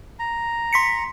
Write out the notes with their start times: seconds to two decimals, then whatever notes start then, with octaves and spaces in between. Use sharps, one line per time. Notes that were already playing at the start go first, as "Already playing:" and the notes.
0.19 A#5
0.73 C6 B6 C#7